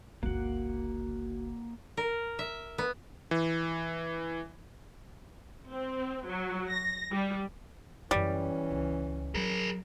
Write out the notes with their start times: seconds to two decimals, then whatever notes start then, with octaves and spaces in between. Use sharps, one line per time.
0.23 G1 C#2 A#3 F#4 F#5
1.97 A#4
2.39 E5
2.78 B3
3.31 E3
5.71 C4
6.27 F#3
6.71 A#6
7.12 G3
8.11 F#2 E3 G3 C#4 E4
8.71 C#2
9.35 F#3 G#4 A#4